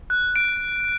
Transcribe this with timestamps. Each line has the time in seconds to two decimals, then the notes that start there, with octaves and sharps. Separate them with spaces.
0.10 F#6
0.36 D7